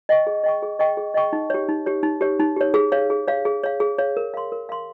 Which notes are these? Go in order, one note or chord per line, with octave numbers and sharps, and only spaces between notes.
D#5 G5 C#6
G#4
D#5 G5 C#6
G#4
D#5 G5 C#6
G#4
D#5 G5 C#6
D#4
G4 C#5
D#4
G4 C#5
D#4
G4 C#5
D#4
G4 C#5
G#4
C#5 F5
G#4
C#5 F5
G#4
C#5 F5
G#4
C#5 F5
A#4
F5 C6
A#4
F5 C6